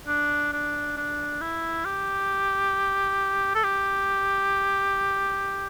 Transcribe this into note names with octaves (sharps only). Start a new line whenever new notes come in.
D4
D4
D4
E4
G4
A4
G4